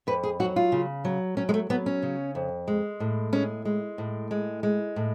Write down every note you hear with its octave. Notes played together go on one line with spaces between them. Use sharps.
F2 B4
G#4
F#3 F#4
F4
C#3
F#3
F#3 C#4
G#3
A3
F#3 B3
C#4
C#3
F2
G#3
A2
G#3 C#4
G#3
A2
G#3
G#3
A2